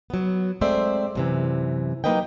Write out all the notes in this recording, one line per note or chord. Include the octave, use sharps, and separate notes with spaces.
F#3 B3
G#3 A3 C4 C5 D5 E5
F#2 C3 E3
F#3 A#3 D#4 B4 D#5 G5